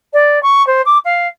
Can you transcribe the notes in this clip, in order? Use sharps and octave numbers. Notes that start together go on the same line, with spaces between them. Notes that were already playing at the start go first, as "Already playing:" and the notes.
D5
C#6
C5
D6
F5